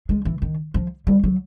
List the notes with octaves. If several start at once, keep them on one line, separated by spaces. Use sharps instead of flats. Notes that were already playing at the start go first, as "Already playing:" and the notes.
G#3
E3
D#3
F3
G3
F#3